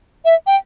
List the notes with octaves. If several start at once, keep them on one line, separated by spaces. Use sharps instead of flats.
E5
G5